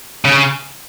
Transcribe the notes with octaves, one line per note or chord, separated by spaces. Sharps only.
C#3